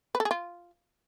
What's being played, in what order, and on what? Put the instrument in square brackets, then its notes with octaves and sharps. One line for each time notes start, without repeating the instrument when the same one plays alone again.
[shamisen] B4
A4
G#4
F4